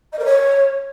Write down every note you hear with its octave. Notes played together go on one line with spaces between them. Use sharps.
D#5
A#4
C#5